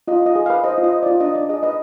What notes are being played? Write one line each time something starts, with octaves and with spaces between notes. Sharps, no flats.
F4 D#5
F4 D#5
G#4
B4 F5
C5 D#5
F4
D#5
C5
F4 D5
D4 D#5
D4 D5
G#4 D#5
B4 D#5